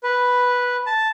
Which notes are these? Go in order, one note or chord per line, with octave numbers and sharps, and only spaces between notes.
B4
A5